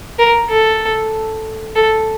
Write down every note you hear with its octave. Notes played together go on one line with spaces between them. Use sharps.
A#4
A4
A4